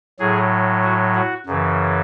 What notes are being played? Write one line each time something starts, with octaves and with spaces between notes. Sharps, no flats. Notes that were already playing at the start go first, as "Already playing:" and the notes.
A2 F#3 G#4
F#4
F#4
F#2 C#3 E3